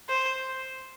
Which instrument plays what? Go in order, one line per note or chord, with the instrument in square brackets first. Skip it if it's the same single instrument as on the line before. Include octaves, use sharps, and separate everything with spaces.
[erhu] C5